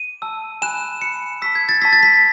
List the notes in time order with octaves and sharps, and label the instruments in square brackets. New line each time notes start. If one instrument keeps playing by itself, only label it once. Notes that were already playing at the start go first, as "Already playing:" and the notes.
Already playing: [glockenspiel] D#7
A5 E6
G#5 B5 F#6 E7
G#5 B5 F#6 C#7
A5 C#6 E6 B6
G#6
A6
A5 C#6 E6 B6
A6
B6